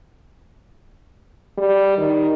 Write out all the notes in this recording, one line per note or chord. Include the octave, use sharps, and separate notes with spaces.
G3
D#3